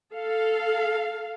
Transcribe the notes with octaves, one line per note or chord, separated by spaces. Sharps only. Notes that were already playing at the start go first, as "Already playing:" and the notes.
A4 F5